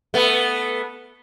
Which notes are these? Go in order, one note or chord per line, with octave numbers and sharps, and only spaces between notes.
A3 B3